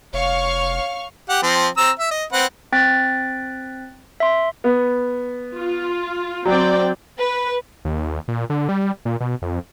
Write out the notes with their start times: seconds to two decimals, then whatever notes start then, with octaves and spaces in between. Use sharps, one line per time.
0.13 F1 C#5 F5 C#6 F6
1.30 G4 F#5
1.43 F3 C4
1.78 C4 A#5 E6
1.99 E5
2.11 D#5
2.33 C4 B4 F#5
2.72 C4 G5 F#6 A6 B6
4.20 E5 C6
4.64 B3
5.56 F4
6.45 F#3 C4 D5 G5
7.18 B4
7.85 D#2
8.28 A#2
8.50 D3
8.69 G3
9.05 A#2
9.21 B2
9.42 F2